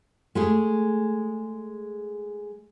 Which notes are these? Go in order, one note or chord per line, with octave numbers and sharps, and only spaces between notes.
G#3 A3 G#4